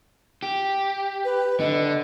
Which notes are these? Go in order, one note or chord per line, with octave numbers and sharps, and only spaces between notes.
G4
B4
D3 D#5